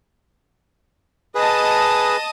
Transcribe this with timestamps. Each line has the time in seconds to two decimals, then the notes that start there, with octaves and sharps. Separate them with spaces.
1.35 G#4 B4 D#5 A5 D#6